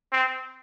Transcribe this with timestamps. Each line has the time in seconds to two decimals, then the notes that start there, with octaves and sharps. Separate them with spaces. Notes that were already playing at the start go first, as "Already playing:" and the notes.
0.12 C4